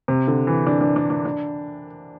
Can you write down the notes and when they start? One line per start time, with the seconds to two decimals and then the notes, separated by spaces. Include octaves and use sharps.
0.08 C3
0.28 D3
0.47 E3
0.67 D4
0.81 D4
0.96 D4
1.10 D4
1.25 D4